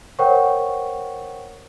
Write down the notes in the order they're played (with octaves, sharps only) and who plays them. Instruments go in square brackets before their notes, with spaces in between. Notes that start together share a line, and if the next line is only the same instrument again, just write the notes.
[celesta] A#4 C5 C#5 F#5 G5 C#6